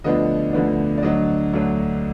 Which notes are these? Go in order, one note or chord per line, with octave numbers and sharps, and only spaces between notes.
D2 D3 F3 B3 D4 D#5
D2 D3 F3 B3 D4
D5
D2 D3 F#3 D4 D#5
D2 D3 F#3 D4